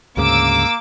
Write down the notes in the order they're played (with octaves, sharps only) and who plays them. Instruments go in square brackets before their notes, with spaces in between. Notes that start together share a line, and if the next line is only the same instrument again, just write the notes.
[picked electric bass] D2 G#2 C#3 [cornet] A#3 [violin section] D6 E6